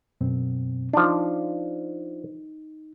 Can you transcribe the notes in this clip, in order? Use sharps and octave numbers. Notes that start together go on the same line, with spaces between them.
F#2 B2 C4
F3 D4 D#4